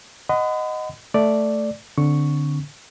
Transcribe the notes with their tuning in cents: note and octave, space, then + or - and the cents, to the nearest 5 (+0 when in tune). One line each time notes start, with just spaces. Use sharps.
D#5 +0 F#5 +0 B5 +40
A3 +0 D5 +0
D3 +0 C4 -10 C#6 +0